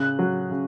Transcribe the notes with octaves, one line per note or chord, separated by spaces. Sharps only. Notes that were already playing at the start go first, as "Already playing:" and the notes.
Already playing: C#3 F#6
F#3
C#3